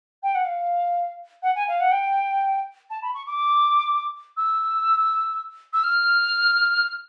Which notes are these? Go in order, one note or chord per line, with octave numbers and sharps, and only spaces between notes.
G5
F#5
F5
F#5
G#5
F5
F#5
G5
A5
B5
C#6
D6
E6
E6
F6